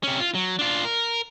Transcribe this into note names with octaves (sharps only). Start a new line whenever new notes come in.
C3 C#4
F4
F#3
D4 F4
A#4